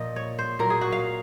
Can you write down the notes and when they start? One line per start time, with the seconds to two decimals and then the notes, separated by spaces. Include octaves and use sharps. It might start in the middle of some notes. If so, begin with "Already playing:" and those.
Already playing: A#2 F3 D#5
0.16 C#5
0.39 C5
0.59 A#2 F#3 A#4
0.70 G#4
0.81 F#4
0.92 F5